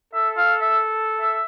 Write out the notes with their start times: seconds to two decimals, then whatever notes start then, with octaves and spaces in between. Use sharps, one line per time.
0.14 A4 E5
0.37 F5
0.61 E5
1.21 E5